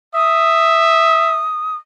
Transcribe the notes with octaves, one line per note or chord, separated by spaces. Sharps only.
E5 D#6